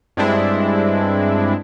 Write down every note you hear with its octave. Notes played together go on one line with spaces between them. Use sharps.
G2 G#3 C4 D4 E4